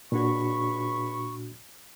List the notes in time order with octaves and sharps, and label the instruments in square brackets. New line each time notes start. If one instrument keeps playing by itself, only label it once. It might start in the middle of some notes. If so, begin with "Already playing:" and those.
[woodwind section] C#2 B5 C#6 [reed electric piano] A#2 D4 F#4